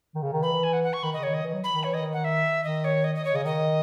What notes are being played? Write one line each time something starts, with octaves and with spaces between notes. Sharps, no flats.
D#3
C#3
D#3
E3 B5
E3
G#5
F#5
F#5
C#6
D#3 B5
C#3 D#5
C#5
D#3 D#5
E3
F#3
B5
D#3
E3 C#5
D#5
D#3
F#5
E5
D#3 D#5
C#5
D#5
D#5
C#5
C#3 D#5
D#3 D#5